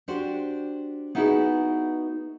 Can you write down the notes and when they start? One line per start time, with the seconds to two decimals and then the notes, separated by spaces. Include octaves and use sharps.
0.08 D4 F#4 G4 C5
1.15 B3 D#4 E4 F#4 G#4 B4